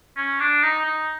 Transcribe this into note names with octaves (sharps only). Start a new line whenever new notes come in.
C#4
D4
D#4
D#4